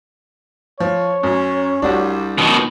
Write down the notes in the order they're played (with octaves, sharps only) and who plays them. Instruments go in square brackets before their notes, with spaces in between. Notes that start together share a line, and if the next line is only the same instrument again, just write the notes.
[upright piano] F3 [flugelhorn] C#5
[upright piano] F#2 [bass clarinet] C#4
[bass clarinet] C2 [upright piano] D4 F#4 G4
[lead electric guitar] B2 D#3